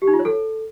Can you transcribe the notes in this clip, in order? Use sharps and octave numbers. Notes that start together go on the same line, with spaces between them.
G4
D#4
F4
C#5
A4